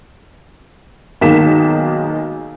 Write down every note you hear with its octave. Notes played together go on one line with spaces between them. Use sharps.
B1 D#3 G#3 A#3 B6 E7